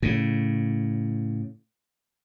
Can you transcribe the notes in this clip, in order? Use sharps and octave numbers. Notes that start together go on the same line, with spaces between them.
A2 C#3